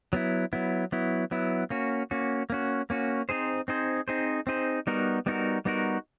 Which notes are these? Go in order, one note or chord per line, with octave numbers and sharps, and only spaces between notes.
F#3 B3 E4
F#3 B3 E4
F#3 B3 E4
F#3 B3 E4
A#3 C#4 F#4
A#3 C#4 F#4
A#3 C#4 F#4
A#3 C#4 F#4
C4 D#4 G#4 C5
C4 D#4 G#4 C5
C4 D#4 G#4 C5
C4 D#4 G#4 C5
G3 B3 D#4 F#4 A#4
G3 B3 D#4 F#4 A#4
G3 B3 D#4 F#4 A#4